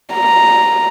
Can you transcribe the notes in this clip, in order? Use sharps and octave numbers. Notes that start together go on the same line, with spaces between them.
A#5